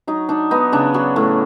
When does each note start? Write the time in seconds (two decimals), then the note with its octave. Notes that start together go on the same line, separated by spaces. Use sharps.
0.07 F#3 D#4
0.29 D4 D#4
0.51 B3 D#4
0.72 C#3 D4
0.94 F#3
1.16 A2